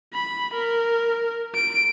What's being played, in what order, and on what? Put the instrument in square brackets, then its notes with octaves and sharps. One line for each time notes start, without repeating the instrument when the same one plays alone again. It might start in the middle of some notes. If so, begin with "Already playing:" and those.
[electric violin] B5
A#4
D7